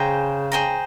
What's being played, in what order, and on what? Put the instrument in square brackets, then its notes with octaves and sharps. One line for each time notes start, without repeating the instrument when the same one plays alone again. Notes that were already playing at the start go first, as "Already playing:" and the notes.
Already playing: [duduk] C#3 [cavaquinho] G#4 C5 G5 A#5
[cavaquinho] G#4 C5 G5 A#5